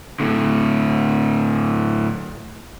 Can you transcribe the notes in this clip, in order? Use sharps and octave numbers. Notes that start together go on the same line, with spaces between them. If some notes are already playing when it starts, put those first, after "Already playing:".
A2 D3